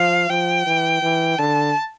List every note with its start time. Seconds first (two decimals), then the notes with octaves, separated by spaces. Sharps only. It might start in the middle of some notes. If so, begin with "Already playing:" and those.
Already playing: F3 F5
0.29 F3 G5
0.66 E3
1.02 E3
1.39 D3 A5